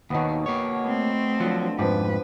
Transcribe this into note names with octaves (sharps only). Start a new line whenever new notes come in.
D#2 B2 D#3 F#3 B3
A#3 C#5
A3 C4 B4
D3 F3 F#3 F4
F2 G#2 F3 G4 B4